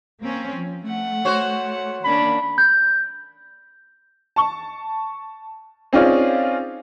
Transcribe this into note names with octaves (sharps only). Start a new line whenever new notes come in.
A#3 C4 C#4
F3
A3 F#5
F#4 C5 C#5
F#5
D#3 A#3 C#4 D4 B5
G6
A5 C#6
C4 C#4 D#4 F4 G#4 D5